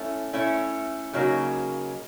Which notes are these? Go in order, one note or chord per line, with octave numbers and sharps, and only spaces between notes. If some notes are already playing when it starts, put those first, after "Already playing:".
Already playing: A3 C#4 E4
A3 C#4 E4
C#3 F#3 A#3 D#4